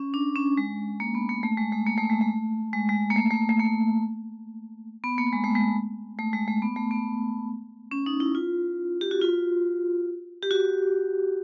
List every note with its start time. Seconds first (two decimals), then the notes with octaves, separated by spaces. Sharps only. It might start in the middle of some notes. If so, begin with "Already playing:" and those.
Already playing: C#4
0.14 D4
0.36 C#4
0.58 G#3
1.00 A#3
1.15 B3
1.29 A#3
1.43 A3
1.58 G#3
1.72 A3
1.87 A#3
1.98 A3
2.10 G#3
2.21 A3
2.73 G#3
2.89 G#3
3.10 A#3
3.16 A3
3.31 A3
3.49 A3
3.60 A#3
5.04 B3
5.18 A#3
5.33 G#3
5.44 A3
5.55 G#3
6.19 A3
6.33 G#3
6.48 A3
6.62 B3
6.76 A3
6.91 B3
7.91 C#4
8.06 D#4
8.20 E4
8.35 F4
9.01 G4
9.11 F#4
9.22 F4
10.42 G4
10.51 F#4